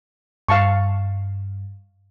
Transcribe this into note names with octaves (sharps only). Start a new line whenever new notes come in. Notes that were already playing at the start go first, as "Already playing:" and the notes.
G2 F5 A5 C#6